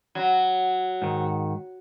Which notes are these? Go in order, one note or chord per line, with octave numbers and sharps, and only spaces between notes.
F#3
G#2 D#3